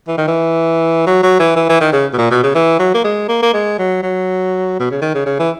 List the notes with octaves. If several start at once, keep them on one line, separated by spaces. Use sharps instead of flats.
E3
D#3
E3
F#3
F#3
E3
E3
E3
D#3
C#3
B2
A#2
B2
C#3
E3
F#3
A#3
G#3
A#3
A#3
G#3
F#3
F#3
B2
C#3
D#3
C#3
C#3
E3